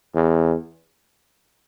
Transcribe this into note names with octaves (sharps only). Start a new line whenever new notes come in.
E2